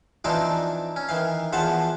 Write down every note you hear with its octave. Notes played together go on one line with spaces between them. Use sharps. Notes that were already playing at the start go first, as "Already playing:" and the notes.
E3 F3 C4 D4 D#4 D5
C#4
D#3 E3 F5
E2 E3 F3 C5 F#5 A5